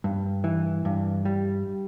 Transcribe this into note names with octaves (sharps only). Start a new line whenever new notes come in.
G2
E3
G2
G3